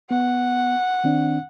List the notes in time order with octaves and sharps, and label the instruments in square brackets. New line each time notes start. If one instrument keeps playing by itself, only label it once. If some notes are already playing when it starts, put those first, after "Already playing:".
[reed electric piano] B3 [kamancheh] F#5
[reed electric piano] D#3 C4 D4